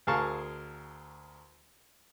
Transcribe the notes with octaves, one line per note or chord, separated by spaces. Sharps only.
D2 G#4 A#4 F5 A5 C#6